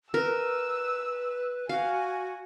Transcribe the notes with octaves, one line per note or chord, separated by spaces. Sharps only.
A#4 B4 E6
F#4 F5 G#5